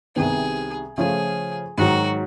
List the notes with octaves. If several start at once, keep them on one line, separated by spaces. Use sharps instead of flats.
C2 C3 D#3 G3 B3 G#4
C#3 F3 A3 C#4 F4 G#4
G#2 D#3 F#3 F#4